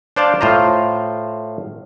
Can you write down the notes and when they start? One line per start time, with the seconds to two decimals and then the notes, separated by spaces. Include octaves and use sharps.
0.16 D4 C5 D5 F5 A5
0.41 A2 F4 C5 A#5